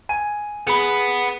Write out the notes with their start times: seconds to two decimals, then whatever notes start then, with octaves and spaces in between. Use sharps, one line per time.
0.09 G#5 D#7
0.67 B3 G#4 B5